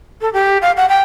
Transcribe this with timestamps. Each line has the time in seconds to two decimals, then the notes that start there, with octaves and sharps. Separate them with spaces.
0.21 A4
0.33 G4
0.62 F5
0.77 F#5
0.89 G5